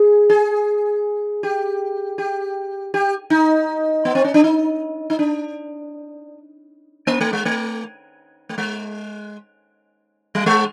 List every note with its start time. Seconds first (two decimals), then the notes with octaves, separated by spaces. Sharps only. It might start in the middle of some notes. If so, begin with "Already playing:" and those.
Already playing: G#4
0.30 G#4
1.43 G4
2.18 G4
2.94 G4
3.30 D#4
4.05 B3
4.15 C4
4.24 C#4
4.34 D4
4.44 D#4
5.10 D#4
5.19 D4
7.07 A#3
7.21 A3
7.33 G#3
7.45 A3
8.49 A3
8.58 G#3
10.35 G3
10.46 G#3